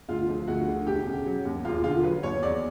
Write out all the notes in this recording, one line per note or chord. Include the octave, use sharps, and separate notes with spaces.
D2 F4
F3
D2 F#4
D3
E1 G4
C#3
F#3
D#2
E1 F4
D3 F4
F#3 B4
D#2 C#5
E2 D5